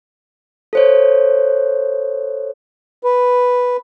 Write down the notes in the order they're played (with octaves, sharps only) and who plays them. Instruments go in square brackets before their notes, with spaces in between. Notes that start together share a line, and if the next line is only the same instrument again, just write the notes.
[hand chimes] A4 C5 C#5
[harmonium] B4